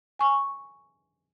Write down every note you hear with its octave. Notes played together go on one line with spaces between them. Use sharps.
G#5 C#6